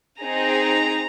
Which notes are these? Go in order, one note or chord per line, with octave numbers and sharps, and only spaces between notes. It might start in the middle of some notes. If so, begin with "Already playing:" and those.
C4 D#4 G#4 A#5